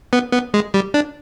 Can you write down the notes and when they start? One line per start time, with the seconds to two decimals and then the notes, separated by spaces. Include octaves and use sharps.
0.13 B3
0.32 B3
0.54 G#3
0.74 G3
0.94 D4